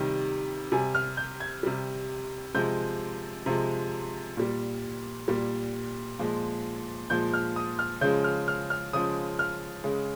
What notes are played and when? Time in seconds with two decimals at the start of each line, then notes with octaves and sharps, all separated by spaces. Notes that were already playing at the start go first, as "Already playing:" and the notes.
Already playing: C3 D#3 G3
0.72 C3 G3 G#5
0.95 F6
1.17 G6
1.40 G#6
1.63 C3 G3
2.54 C3 F3 G#3 G6
3.46 C3 F3 G#3
4.37 A#2 G3
5.28 A#2 G3
6.19 A#2 F3 G#3
7.10 A#2 F3 G#3 G6
7.34 F6
7.56 D#6
7.79 F6
8.01 C#3 F3 G#3 G6
8.24 F6
8.48 F6
8.70 F6
8.93 C#3 F3 G#3 D#6
9.39 F6
9.84 C#3 G#3